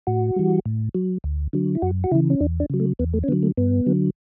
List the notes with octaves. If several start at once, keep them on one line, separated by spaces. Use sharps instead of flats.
A2 F#4
E3 G3
A2
F#3
D2
D3 F#3
E4
F#2 F#4
F#4
C#3 E3 E4
C#4
E2 D4
D4
C#3 F#3
A3
E2 B3
A3
C#4
D3 F#3 B3
A3
G2 B3
D3 F#3